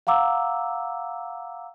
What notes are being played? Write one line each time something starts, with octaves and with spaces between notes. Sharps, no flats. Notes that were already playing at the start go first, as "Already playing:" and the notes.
F5 F#5 A#5 D6 E6